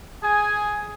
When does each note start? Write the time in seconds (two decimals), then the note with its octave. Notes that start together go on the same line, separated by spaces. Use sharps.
0.23 G#4 G#5